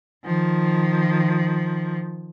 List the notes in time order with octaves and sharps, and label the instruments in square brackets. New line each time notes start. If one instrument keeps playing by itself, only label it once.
[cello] D#3 F3